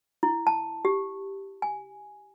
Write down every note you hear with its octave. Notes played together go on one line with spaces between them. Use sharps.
E4
A5
G4
G#5